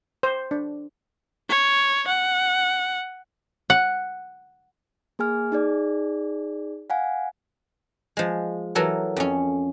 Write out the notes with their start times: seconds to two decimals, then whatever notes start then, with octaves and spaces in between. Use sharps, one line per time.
0.23 C5
0.51 D4
1.49 C#5
2.07 F#5
3.70 F#5
5.19 A#3 G#4 G#5 F6
5.52 D#4 G#4 D5
6.90 F5 F#5 G#5
8.17 F3 G#3
8.75 E3 F#3 A4 A#4
9.16 F2 C#4